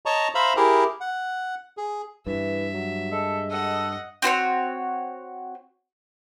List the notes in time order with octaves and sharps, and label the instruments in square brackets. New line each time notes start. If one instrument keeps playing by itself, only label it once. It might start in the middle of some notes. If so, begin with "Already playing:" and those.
[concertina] C#5 D#5 A5 A#5 C#6
C5 E5 F5 A#5 B5
E4 G4 G#4 A#4
F#5
G#4
[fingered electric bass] G2 [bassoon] E3 [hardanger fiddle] E5
[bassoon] F#3
[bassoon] G#3 [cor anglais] A4
[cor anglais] A4 [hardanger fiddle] D#5 F#5
[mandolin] C4 F#4 C5 C#5